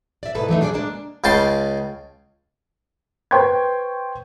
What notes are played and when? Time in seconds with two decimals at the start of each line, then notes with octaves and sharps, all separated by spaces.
0.23 D5 E5
0.35 G#2 B2 E4 A4 B4
0.48 E3 F#3 A3 D#4
0.61 A3 D4 G#4 B4 D5
0.73 G#3 A#3 D4
1.24 C#2 C#3 G5 A5 C6
3.31 B4 C5 G5 C6 C#6 G#6